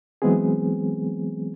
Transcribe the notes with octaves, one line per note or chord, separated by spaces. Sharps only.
E3 F#3 G#3 B3 C4 G#4